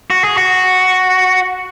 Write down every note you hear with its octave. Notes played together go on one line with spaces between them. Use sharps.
F#4
G#4
F#4